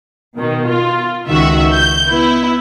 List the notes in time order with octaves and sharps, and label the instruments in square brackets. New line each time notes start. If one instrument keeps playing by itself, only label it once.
[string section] B2 D#3
F4
C#2 D#3 F#4 E5
G6
B3 E4